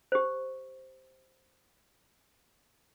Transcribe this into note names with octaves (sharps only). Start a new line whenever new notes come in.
G4 C5